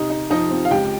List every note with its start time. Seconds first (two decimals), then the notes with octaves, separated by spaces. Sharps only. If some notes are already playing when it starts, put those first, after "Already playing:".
Already playing: C3 D#4 D#5
0.10 D#4
0.30 F3 D#4 D#5
0.51 C4
0.65 F5
0.71 C#2 G4 G5